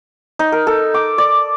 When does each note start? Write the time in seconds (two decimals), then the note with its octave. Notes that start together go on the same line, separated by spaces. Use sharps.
0.39 D#4
0.52 A#4
0.67 A4
0.94 D6
1.18 D5